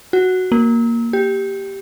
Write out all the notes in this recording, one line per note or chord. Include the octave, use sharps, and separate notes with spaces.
F#4
A#3
G4